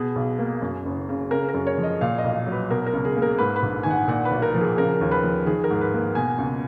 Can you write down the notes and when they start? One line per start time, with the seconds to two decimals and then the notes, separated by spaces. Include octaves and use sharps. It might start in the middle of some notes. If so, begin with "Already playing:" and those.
Already playing: B2 G#4
0.16 B1
0.39 A#3
0.62 F#2
0.85 F#1
1.09 C#3
1.31 C#3 A#4
1.49 A#4
1.54 F#2
1.67 C#5
1.78 F3
1.83 D#5
2.01 A#2 F5
2.18 D#5
2.24 B1
2.47 F#3
2.52 B4
2.70 B2 A#4
2.87 A#4
2.93 C#2
3.05 G#4
3.16 A#3
3.22 A#4
3.38 G#2 B4
3.56 B4
3.63 A#1
3.83 D#3 G#5
3.90 F#5
4.08 A#2 F#5
4.25 B4
4.31 B1
4.42 A#4
4.54 F3
4.61 G#4
4.78 C#3 A#4
5.01 D#2
5.11 B4
5.24 F3
5.46 D#3 G#4
5.64 A#4
5.70 G#2
5.81 B4
5.93 A#3
6.15 B2 G#5
6.38 C#2